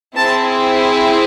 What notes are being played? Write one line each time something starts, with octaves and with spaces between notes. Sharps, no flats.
C4 E4 G#4 A5